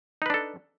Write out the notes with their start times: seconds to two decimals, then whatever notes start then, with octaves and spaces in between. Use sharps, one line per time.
0.22 D#4
0.26 B4
0.30 D4
0.34 A4